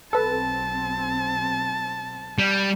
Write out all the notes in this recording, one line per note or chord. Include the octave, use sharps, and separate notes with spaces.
B1 C4 A4 B4 A5
G3